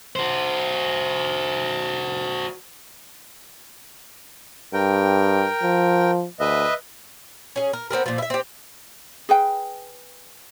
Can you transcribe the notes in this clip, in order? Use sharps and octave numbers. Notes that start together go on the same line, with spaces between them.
F#4 C5
G2 A#4 G5
F3
D2 B4 D#5 E5
C#4 G#4
A#4
B3 C4 G#4 A#4
A#2 F3
E4 E5
C4 G4
G#4 B4 G5